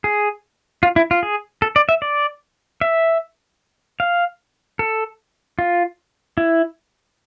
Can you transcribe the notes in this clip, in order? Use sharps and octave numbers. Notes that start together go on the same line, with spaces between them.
G#4
F4
E4
F4
G#4
A4
D5
E5
D5
E5
F5
A4
F4
E4